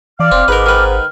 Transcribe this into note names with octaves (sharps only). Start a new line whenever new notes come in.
E3 D5 F5 D6 F6
F1 C4
G#1 G#2 A#4 B4
D#3 B4
F6